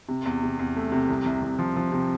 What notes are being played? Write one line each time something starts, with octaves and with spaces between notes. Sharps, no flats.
C3
E2
C3
E2
A3
C3
C2
C2
C2
F3
F3
C3